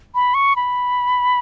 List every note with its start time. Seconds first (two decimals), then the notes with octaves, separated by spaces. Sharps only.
0.15 B5
0.34 C#6
0.56 B5